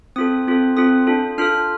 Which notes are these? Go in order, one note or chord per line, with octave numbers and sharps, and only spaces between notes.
C4 F4 A4 D#6
C4 F4 A4
C4 F4 A4 D#6
D4 F4 A4
D4 F4 A4 F6